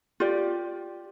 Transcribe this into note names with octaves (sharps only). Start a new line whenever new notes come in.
F4 G4 D5